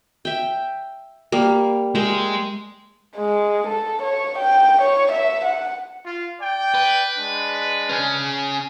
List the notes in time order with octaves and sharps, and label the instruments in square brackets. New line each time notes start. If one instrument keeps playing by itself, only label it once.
[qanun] E5 G5
G3 A#3
[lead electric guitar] G#3 [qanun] A#4 E5 G5
[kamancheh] G#3
A4
C#5
G5
C#5
E5
F#5
[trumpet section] F4
D5 G5
[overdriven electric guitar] B4
[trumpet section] G#3 D4
[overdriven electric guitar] C#3 C#4